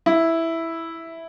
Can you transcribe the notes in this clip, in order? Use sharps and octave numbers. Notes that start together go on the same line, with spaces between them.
E4